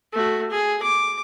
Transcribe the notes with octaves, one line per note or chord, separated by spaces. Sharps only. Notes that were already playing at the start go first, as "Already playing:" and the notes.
A3 F#4
G#4
D6